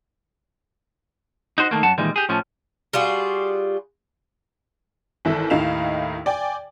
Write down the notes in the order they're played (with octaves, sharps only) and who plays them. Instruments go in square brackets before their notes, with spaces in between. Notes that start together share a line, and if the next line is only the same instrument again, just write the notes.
[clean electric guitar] D#4 F#4 C5
D#3 E3 A3 A#3
F#2 F#3 F#5 A5
A#2 D#3 E3 G3 G#3
G4 G#4
A2 F3 C#4
[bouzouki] G3 F4 F#4 G#4
[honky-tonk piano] G#1 E3 E4 A4
D#2 A2 D#4 F5 E7 F7
D5 G5 G#5